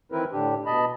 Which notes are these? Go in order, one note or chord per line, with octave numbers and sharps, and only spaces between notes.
D#3 E3 C4 E4 A#4 B4
A2 D3 D4 G4
B2 D#5 A5 B5